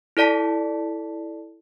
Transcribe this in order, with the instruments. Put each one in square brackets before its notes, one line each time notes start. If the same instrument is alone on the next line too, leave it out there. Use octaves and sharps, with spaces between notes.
[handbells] E4 A4 D5 A5 B6